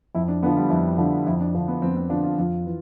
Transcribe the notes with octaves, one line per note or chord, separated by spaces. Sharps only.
F2 E4
D4
D3 F3 B3
G3
F2 E4
D3 F3
F2 E4
D4
D3 F3
B3
F2 C4
C4
D3 F3 D4
F4
F2 F4
E3